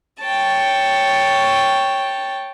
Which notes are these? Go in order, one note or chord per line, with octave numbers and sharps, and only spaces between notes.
C#5 G5 A5